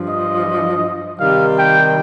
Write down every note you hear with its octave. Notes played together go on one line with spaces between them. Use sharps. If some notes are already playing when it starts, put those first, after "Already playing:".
Already playing: G2 F3
D#5
C3 D#3 G3 F5
G5